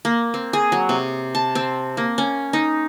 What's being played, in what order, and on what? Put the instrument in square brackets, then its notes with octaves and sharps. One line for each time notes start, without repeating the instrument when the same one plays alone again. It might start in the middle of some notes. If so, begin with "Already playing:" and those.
[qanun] A#3
C4
G#4
F#3
C3
A5
C4
A#3
C#4
D#4